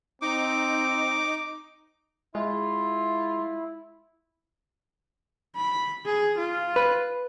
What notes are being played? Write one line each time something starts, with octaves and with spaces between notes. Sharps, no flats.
C4 D#4 D6
G#3 E4 F4
B5
G#4
F4
B4